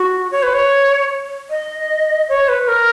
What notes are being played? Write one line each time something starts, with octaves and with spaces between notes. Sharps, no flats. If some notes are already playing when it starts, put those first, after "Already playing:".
Already playing: F#4
C#5
B4
C#5
D#5
C#5
B4
A#4